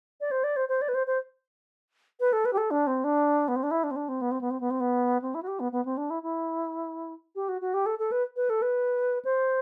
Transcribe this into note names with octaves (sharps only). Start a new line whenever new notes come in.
D5
C5
D5
C5
C5
D5
B4
C5
C5
B4
A4
B4
G4
A4
D4
C4
D4
B3
C4
D4
E4
D4
C4
D4
C4
B3
C4
B3
C4
B3
C4
B3
C4
E4
F#4
G4
B3
B3
C4
D4
E4
E4
G4
F#4
F#4
G4
A4
A4
B4
B4
A4
B4
C5